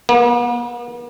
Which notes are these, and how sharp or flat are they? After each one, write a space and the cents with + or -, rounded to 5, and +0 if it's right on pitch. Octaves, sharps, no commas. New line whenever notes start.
B3 -45